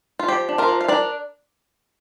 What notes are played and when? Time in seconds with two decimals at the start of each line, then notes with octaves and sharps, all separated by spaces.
0.19 F4
0.28 F3 G4
0.49 D4
0.58 F4 A#4
0.68 F3
0.81 F5
0.88 D4 A#4 D5